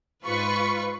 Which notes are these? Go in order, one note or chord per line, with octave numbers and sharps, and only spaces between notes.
G#2 F4 B4 C#6